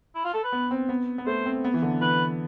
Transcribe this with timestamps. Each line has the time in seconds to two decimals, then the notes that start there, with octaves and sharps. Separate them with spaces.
0.15 E4
0.25 F4
0.34 A4
0.43 B4
0.52 B3
0.71 C4
0.89 B3
1.18 B3
1.26 A3 C5
1.46 C4
1.64 B3
1.74 E3
1.82 D3
2.01 E3 B4